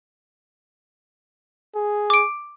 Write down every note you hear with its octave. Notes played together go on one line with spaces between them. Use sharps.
G#4
D6 D7